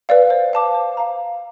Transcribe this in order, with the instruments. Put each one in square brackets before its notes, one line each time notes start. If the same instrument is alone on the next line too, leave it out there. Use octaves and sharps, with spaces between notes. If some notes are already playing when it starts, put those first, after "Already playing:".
[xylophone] B4 D5 F5
C5
F5 A5 D6
C5
F5 A#5